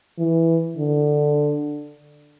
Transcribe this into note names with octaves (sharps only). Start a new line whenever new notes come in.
E3
D3